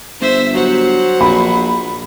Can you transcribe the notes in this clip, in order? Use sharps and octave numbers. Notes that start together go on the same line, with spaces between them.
G1 C5 E5
F#3 C5 F#5
A#1 B5